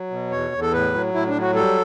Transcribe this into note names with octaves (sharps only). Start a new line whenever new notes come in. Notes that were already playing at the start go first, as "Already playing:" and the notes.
Already playing: F#3
B2
E2 C#5
E2
A4
A2 B4
F#3
A2 E4
D4
F#3
F#4
G3 A4